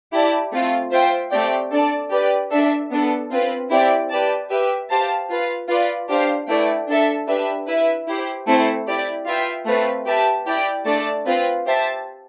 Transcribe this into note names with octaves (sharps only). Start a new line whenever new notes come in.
E4 G4 D5 A5
A3 C4 F4
F4 C5 E5 G5
A3 C4 G4 D5 G5
D4 A4 D5 A5
G4 B4 D5
D4 A4 E5
B3 D4 A4
C4 F4 B4
C4 E4 G4 D5 G5
G4 B4 D5 A5
G4 B4 E5
G4 C5 F5 A5
F4 B4 F5
F4 B4 D5
D4 G4 C5 F5
A3 E4 B4 D5 G5
D4 A4 E5
D4 G4 B4 E5
E4 B4 E5
E4 G4 C5
A3 C4 E4 A4 C5
E4 G4 D5
F4 B4 E5 G5
A3 C4 F4 B4
G4 B4 E5 A5
E4 G4 D5 G5
A3 D4 A4 D5 A5
C4 F4 B4
G4 C5 E5 A5